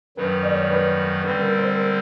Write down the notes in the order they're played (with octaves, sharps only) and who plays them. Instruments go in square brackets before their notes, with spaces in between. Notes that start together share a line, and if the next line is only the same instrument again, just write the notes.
[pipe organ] F#2 D#3 F#3 [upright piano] B4
[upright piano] D5
C#5
B4
[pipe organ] D3 G3 C4 [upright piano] B4
[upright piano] A#4
C5
A#4